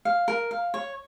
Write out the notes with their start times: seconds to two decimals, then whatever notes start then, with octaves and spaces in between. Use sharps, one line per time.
0.05 F5
0.28 A#4
0.51 F5
0.74 C#5